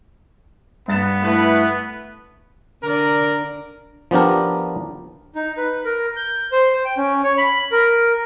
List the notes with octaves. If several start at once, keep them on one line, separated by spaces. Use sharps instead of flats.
G2 B3 A6 E7
A3 E4 B4
D3 A#4 D5
F3 B3 D4 G4 A#4
D#4
B4
A#4
G6
C5
G5
C#4
C#5
B5
A#4